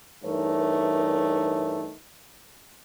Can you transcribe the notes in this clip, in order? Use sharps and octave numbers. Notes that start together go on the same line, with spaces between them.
G2 E3 A3 D#4 A#4 C#5